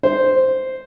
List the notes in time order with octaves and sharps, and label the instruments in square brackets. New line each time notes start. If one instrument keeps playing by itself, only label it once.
[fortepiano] C5